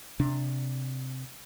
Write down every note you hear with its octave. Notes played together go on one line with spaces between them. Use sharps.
C3 D4